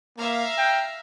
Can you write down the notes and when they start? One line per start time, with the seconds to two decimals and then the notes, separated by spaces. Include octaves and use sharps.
0.18 A#3 E5 F5 A#5
0.58 G5